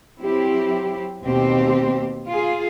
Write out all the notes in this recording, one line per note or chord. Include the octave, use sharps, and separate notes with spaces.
F#3 C4 E4 G4
D#2 B2 C4 G4
F4 G#4